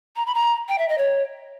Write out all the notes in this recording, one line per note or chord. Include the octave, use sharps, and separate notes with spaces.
A#5
B5
A#5
G5
E5
D#5
C#5